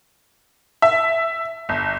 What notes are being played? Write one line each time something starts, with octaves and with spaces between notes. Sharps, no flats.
E5
G1